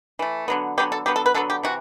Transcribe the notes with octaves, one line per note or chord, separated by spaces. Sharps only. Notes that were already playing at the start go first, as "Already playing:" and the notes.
E3 A3
D3 F#3 B3
D3 F#3 B3 G4
A4
D3 F#3 B3 G4
A4
B4
D3 F#3 B3 A4
G4
C3 E3 F#4